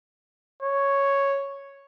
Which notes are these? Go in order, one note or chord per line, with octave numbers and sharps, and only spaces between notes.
C#5